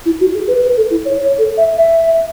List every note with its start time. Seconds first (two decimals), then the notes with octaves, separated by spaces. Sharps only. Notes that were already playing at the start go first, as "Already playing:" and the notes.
0.06 E4
0.20 F#4
0.34 G#4
0.48 B4
0.63 B4
0.77 A4
0.90 E4
1.05 C#5
1.19 C#5
1.38 A4
1.57 E5
1.76 E5